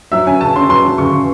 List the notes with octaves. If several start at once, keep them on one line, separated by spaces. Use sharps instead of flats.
F#3 E5
C#4 G#5
C#3 A5
C#4 C6
F#3 C6
F#3
C#3 C#6
C#3